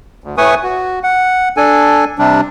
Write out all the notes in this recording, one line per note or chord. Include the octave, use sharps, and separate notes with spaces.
D2
A2 A3 B4 G#5 C#6 D#6
F#4
F#5
D4 A4 G#5
C3 G3 D4